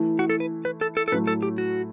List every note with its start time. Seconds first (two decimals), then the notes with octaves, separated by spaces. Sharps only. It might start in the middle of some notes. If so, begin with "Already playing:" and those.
Already playing: E3 A3 E4
0.19 F#4
0.30 A4
0.40 B4
0.65 B4
0.81 A4
0.97 A4
1.08 A4
1.12 A2 F#3 A3 B4
1.27 A4
1.43 G4
1.58 F#4